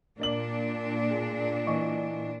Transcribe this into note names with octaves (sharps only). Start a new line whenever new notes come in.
A#2 A#3 D4 D5 F#7
G#4
E3 D#5 C#6